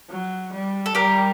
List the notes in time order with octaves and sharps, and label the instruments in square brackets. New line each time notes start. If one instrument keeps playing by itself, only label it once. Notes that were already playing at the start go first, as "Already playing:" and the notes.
[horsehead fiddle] F#3
G3
[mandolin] A4
[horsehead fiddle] G3 [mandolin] G4 A#4